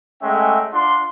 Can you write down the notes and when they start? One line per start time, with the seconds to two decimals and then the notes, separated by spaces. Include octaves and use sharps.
0.22 G#3 A3 C#4 E5 F#5 G5
0.72 D4 F4 F#5 C6